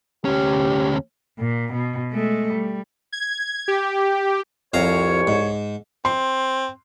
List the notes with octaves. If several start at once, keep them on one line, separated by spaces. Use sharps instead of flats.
D2 C#4 G4
A#2
B2
G#3 A3
G3
G#6
G4
C2 F2 C#5 F5 A#5
G#2
C4 C6